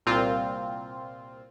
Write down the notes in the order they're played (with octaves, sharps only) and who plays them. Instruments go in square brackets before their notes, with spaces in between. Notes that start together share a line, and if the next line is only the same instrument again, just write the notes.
[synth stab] C2 A#2 C4 F4